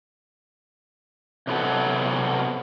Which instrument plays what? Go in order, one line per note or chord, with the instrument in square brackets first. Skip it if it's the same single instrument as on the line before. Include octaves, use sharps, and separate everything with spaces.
[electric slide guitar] C3 F#3 B3 A4